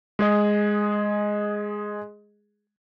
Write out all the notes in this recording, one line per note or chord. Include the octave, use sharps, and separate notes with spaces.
G#3 G#4 D#5